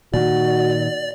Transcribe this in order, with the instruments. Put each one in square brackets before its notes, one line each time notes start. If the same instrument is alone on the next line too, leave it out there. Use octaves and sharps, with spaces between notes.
[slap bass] A#2 D#3 [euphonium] F#4 [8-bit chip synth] D5